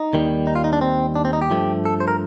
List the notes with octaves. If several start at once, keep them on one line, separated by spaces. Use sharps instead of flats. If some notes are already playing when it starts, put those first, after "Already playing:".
Already playing: D#4
D#2 D#3 G3
D#4
F4
D#4
D4
C4
D4
C4
D#4
G4
G2 F3 A3
A4
C5
A#4